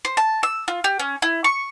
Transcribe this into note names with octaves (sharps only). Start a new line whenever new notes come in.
C5
A5
E6
F4
G4
C#4
E4
C#6